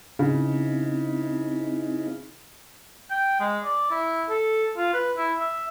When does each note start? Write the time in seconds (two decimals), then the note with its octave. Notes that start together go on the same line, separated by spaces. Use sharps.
0.19 C#3 C4 D#4 E4
3.10 G5
3.40 G#3
3.64 D5
3.91 E4
4.29 A4
4.77 F4
4.94 B4
5.17 E4
5.40 E5